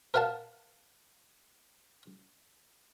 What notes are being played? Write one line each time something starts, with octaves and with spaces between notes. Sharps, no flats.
A#4 B4 F5 F#5 A5